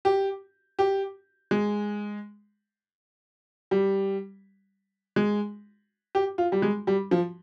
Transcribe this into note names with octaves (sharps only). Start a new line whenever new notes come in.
G4
G4
G#3
G3
G#3
G4
F4
G3
G#3
G3
F3